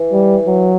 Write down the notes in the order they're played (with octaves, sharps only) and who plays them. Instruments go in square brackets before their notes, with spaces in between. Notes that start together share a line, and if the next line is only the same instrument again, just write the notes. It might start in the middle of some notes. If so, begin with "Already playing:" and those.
Already playing: [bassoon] E3
[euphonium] G3
F#3